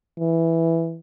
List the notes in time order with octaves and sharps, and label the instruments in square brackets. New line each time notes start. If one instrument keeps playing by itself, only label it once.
[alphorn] E3